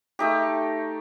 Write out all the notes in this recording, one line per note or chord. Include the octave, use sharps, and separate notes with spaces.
A3 D#4 G4